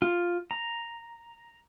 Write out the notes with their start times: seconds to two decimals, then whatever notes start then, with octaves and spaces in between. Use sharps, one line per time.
0.02 F4
0.51 A#5